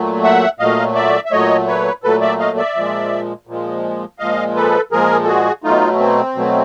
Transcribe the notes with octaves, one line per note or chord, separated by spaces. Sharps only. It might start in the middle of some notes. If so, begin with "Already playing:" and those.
Already playing: A#2 F#3 A3
E5 F#5
A#2 F#3 A3 D#5 F5
D5 E5
E5
A#2 F#3 A3 C#5 D#5
B4 C#5
A#2 F#3 A3 A4 B4
D5 E5
D#5 F5
D5 E5
A#2 F3 G#3
A#2 F3 G#3
A#2 F3 G#3 D#5 F5
A4 B4
A#2 F3 G#3 G#4 A#4
A4
F#4 G#4
B2 F#3 A3 D#4 F4
C4
B2 F#3 A3